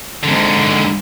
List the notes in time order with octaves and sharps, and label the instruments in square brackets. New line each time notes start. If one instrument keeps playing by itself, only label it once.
[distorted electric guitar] G#2 D3